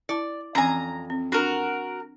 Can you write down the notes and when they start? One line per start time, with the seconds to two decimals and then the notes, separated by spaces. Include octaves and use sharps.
0.09 E4 D5 A5
0.55 F2 E3 C4 C#4 G#5 A#5
1.10 C4
1.32 D4 F#4 A#4